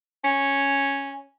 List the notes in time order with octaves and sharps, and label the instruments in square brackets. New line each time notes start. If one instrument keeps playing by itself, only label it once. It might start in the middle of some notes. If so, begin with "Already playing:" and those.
[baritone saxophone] C#4